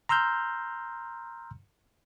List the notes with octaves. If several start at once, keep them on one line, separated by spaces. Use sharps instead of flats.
A#5 C6 E6 F6 G6